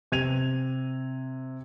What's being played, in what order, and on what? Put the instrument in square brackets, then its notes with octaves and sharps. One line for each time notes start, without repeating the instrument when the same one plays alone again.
[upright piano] C3 G#6 D#7 F7